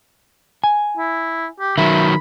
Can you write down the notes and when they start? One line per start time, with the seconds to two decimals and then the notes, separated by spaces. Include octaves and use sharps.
0.64 G#5
0.97 E4
1.60 G4
1.78 D#3 F#3 E5 B5